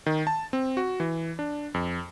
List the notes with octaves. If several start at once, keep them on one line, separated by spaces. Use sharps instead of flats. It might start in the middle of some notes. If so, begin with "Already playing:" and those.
D#3
A5
C4
F#4
E3
D4
F2